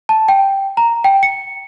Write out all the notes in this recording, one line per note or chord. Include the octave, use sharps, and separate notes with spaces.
A5
G5
A#5
G5
C#7